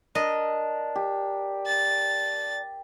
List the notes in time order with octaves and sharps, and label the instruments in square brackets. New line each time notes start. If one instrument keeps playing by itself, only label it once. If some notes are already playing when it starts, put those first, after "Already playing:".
[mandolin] D4 [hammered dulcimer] A#4 [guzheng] D#5
[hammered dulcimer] G4
[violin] A6